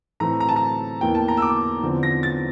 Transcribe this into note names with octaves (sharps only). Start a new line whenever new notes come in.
A2 E3 A3 C4 A#5
A#5
A5
A#5
E2 E3 A#3 G5
A5
A#5
E6
D6
E2 D3 F3 C4
A#6
A6